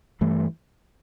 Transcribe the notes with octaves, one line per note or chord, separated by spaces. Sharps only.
G2 E3 A3